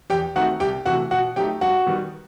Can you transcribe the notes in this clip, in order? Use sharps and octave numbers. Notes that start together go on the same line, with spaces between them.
E2 G4 G5
D#3 A3 C4 D#4 F#4 F#5
C2 G4 G5
C3 E3 A3 F#4 F#5
B2 F#4 F#5
F#3 A3 D#4 G4 G5
G2 F#4 F#5
D#3 G3 B3